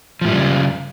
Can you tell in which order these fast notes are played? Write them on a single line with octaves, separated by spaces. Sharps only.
F3 A2 G3 F#2 C#3